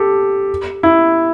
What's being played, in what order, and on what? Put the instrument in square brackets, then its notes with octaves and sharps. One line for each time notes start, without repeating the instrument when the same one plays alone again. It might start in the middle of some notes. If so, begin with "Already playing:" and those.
Already playing: [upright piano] G4 A4
E4